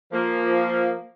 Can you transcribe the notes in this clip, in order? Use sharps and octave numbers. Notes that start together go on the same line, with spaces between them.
F3 A#3